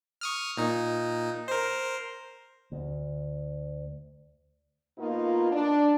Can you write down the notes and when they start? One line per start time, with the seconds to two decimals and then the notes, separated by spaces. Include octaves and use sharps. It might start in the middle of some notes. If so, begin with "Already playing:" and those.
0.21 C#6 D#6 F6
0.57 A#2 D#4
1.48 A#4 C5
2.72 D2
4.98 B2 A#3 D#4 F4
5.51 D4